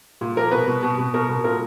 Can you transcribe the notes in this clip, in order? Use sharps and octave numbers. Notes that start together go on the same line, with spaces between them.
A#2
F3 A#4
B2 B4
B2
B2
B2
B2 A#4
B2
A#2 A#4